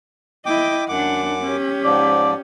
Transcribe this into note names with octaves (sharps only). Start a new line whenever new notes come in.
E4 D#5 G5 D6
F#2 D4 F#5 D6
C#4 G4
G#2 F3 D5